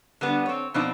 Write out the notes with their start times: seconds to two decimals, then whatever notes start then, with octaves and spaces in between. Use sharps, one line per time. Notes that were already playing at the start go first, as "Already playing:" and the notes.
0.21 D3 G3 B3
0.46 C4 C#5
0.74 F2 B2 C4 D4 D#4